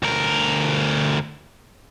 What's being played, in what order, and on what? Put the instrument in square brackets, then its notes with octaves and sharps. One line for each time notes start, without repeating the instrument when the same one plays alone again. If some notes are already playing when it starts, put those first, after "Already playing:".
[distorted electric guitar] D2 A#4